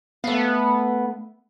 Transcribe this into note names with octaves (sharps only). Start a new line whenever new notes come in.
A3 B3 F5